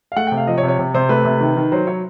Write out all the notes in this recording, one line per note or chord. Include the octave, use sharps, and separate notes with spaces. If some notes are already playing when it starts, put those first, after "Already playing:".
F5
A3 F#5
C3 G5
F5
F3 D#5
C#5
C3
C#5
C3
C3 C5
A3 B4
C3
D#3
D#3
F#3 C5
F#3 C#5